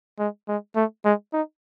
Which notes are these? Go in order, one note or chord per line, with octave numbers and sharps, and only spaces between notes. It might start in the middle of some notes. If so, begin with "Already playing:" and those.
G#3
G#3
A3
G#3
D#4